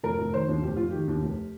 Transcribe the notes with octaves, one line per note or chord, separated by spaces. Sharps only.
F1 A#4
F1
D#3 C5
D#2
F1 G4
F1 F4
D#3 G4
D#2
F1